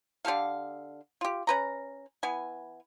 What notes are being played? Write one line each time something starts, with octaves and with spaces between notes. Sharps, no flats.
D3 G4 A4 F5
F4 G4
C#4 B4 A#5
E3 B3 G#5